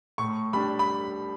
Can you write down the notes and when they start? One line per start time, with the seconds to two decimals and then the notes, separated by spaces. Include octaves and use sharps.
0.18 A2 C#6
0.53 G3 D4 B5
0.79 B5